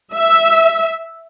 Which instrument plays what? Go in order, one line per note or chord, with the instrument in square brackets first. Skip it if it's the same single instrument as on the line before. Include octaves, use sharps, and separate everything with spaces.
[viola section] E5